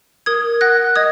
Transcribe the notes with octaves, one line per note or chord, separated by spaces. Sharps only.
A#4 D#6 G#6
F#5 F#6 A#6
D#5 D#6 G#6